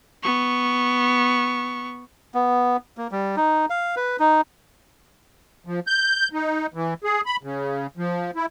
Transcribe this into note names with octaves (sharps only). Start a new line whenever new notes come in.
B3 C#6
B3
A#3
G3
D#4
F5
B4
D#4
F3
G6
D#4
E3
G#4
B5
C#3
F3
E4